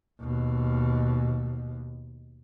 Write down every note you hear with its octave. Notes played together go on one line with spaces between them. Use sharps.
D#2 B2